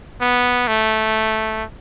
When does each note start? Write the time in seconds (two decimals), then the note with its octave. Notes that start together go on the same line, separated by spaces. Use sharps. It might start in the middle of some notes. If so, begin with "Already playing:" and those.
0.21 B3
0.67 A3